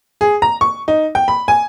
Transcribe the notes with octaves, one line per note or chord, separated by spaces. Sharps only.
G#4
A#5
C#6
D#4
G5
B5
G#5